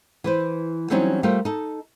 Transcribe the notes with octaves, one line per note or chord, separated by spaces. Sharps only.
E3 B4 C5
E3 F#3 G3 C4 C#4 D#4
G3 A3 F4 A#4 C5
D#4 A4